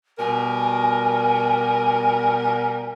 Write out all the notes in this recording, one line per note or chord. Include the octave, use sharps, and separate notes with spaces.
B2 G3 A#4 G#5